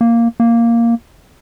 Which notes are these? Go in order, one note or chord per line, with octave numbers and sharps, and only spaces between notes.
A#3
A#3